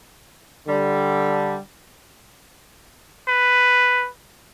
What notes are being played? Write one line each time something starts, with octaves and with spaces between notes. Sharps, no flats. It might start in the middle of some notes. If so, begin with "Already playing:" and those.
D3 G3
B4